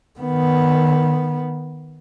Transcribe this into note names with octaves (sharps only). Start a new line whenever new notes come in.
D#3 B3